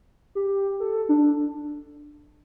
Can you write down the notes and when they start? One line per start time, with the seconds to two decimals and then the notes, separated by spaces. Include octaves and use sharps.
0.35 G4
0.80 A4
1.09 D4